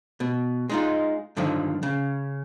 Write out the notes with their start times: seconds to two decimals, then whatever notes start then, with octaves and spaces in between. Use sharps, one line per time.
0.20 B2
0.70 G#3 D#4 F4
1.37 G2 D3 D#3 F3
1.83 C#3